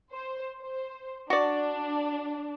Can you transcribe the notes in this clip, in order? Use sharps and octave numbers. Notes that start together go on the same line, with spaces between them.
C5
C5
D4 F#4 D5